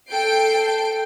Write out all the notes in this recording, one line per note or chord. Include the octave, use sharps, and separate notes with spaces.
A4 G5 G6 C7 D7